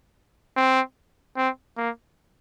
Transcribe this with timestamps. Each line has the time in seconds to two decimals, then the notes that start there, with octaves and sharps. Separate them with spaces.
0.57 C4
1.37 C4
1.77 A#3